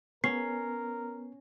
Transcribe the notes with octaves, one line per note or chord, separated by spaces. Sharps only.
B3 C#4 A#4 C7